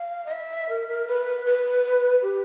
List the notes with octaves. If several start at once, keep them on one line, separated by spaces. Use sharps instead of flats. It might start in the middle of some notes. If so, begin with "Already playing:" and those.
Already playing: F5
D#5
E5
A#4
A#4
B4
B4
G4